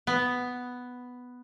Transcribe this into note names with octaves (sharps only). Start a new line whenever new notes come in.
B3